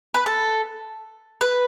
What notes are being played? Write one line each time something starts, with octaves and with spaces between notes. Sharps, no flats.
B4
A4
B4